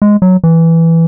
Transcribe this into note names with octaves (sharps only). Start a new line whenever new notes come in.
G#3
F#3
E3